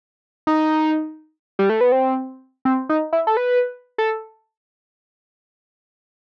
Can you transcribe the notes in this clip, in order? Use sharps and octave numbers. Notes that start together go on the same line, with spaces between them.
D#4
G3
A3
B3
C4
C4
D#4
E4
A4
B4
A4